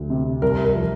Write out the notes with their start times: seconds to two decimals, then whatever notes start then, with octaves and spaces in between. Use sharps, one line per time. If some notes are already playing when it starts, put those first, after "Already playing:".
Already playing: D2
0.10 C3
0.42 C2 A#4
0.64 A#4
0.75 F3